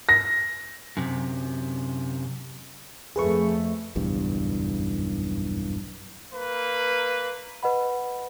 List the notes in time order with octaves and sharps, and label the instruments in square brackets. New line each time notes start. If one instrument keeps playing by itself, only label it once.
[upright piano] A#6
[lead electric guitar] F#2 C3
[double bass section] F2 A3 [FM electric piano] G#4 B4 C#6
[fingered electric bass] F#1 B1 E2 G2
[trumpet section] A#3 B4
[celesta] B4 D#5 F#5 B5